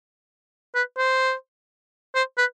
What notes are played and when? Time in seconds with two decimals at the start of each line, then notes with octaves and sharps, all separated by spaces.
0.75 B4
0.98 C5
2.15 C5
2.38 B4